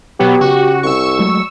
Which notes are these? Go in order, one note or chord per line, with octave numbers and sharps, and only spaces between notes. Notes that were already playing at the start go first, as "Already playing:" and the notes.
B2 F#3 B3 G4
C#3 F#4
C2 C#6 E6
F#3 G#3 A3